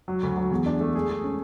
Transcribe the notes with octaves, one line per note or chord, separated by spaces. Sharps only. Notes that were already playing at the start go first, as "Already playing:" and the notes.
F#3
D2
F#3
E2
D4
A3
G#4
G#4
C#4